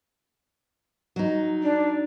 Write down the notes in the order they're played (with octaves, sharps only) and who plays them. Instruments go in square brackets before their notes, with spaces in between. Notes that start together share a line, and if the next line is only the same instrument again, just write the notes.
[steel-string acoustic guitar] F#3 D#4
[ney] D4